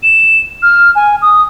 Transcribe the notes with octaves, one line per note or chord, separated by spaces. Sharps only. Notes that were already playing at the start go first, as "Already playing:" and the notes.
E7
F6
G#5
D#6